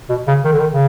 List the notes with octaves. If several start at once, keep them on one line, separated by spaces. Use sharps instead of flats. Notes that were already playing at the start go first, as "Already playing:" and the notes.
B2
C#3
D#3
D3
D#3
C#3